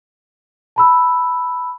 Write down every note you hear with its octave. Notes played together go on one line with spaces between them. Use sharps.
A5 B5 E6